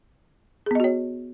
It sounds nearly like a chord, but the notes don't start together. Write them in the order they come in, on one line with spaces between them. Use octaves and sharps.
G#4 B3 D#5 F#4 C#5